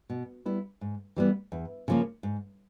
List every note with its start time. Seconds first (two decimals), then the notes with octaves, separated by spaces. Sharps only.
0.10 B2
0.46 G3 B3 E4
0.81 G#2
1.16 E3 G3 B3
1.52 E2
1.88 C#3 F3 A#3 C#4
2.23 G#2